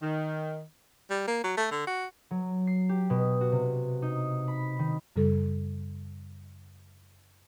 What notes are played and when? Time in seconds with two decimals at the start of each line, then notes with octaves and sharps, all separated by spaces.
0.02 D#3
1.11 G3
1.28 A#3
1.44 F#3
1.57 A3
1.71 D3
1.87 F#4
2.31 F#3
2.67 C7
2.89 G4
3.10 B2
3.41 F#4
3.52 C3
4.02 D#4
4.48 B5
4.79 D#3
5.16 F#2 C#3 G3 A4